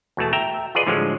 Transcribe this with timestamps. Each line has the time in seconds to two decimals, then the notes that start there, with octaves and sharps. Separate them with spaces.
0.17 E2 B2 A3 A5
0.33 E5 G5 A#5
0.75 F4 G#4 B4 D5 D#5
0.87 A2 D3 F3 F#3 G#3